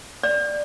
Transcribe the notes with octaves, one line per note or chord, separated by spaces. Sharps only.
D5